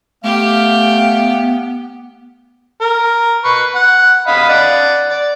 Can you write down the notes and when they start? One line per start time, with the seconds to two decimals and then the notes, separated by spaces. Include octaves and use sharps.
0.24 A3 B3 G4 F5
2.81 A#4
3.44 B4 C#6
3.75 F#5
4.27 D#5 F5 B5
4.49 D5 F#5
5.10 D5